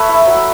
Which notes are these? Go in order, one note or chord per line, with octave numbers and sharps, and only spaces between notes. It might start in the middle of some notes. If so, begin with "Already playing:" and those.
Already playing: A3 A4 B4 C#5 E5
E4
F#3